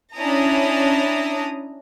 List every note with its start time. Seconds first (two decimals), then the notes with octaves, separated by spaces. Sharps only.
0.17 C#4 D4 E4 A#5 D#6